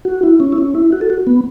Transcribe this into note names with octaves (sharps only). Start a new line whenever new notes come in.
F#4
E4
C#4
E4
C#4
E4
F#4
A4
F#4
B3